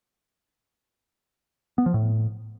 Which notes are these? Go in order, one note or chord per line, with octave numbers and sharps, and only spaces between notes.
B3
F3
A2